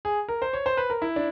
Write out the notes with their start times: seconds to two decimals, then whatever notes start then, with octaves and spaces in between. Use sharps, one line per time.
0.05 G#4
0.28 A#4
0.42 C5
0.53 C#5
0.66 C5
0.77 B4
0.90 A#4
1.02 E4
1.16 D4